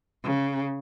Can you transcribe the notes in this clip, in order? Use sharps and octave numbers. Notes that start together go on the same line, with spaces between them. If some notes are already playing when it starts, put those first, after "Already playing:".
C#3